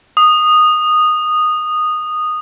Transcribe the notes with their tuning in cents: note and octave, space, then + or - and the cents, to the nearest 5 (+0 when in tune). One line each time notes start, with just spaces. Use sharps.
D#6 -10